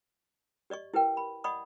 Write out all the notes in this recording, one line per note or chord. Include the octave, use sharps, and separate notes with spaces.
G4 D5 D#5 C#6
E4 G4 A#4 B4 G5
B5
D5 D#5 F#5 B5 C#6 D#6